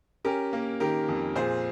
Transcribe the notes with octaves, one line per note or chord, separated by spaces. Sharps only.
C#4 G4 A#4
A#3
D#3 G4 A#4
F2
A#2 G#4 C5